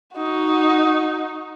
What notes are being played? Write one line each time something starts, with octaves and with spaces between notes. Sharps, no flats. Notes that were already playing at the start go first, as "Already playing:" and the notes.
D#4 F#4